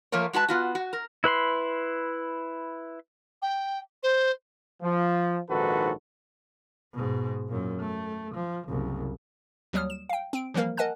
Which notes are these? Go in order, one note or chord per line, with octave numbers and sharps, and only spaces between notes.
F3 A3 A#3 A#4 C#5
G#3 F#4 B4 A5
B3 F4 F#4
F#4
A#4
E4 B4 B5 C6
G5
C5
F3
A#1 G#2 D#3 F#4 A4 B4
G#2 B2
F#2 A#2
A3
F3
F#1 C2
D#2 F#3 G3 D#6 F6
E7
F5 G5
C4 D7
E3 F3 G3 A#3 A#4
A#4 D#5 F#5 G#5 A5 F#6